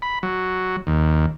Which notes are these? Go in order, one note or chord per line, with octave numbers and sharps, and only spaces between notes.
B5
F#3
D#2